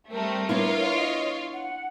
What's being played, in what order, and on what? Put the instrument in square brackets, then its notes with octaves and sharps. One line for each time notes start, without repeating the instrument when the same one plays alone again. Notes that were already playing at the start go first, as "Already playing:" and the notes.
[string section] G3 A3 C4 [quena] A#4
[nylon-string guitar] B3 D4 E4 [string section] F4 C#5
[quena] D#5
F#5